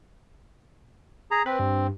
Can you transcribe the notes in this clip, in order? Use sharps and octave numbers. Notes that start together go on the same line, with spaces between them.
G#4 A#5
C4 B4
G2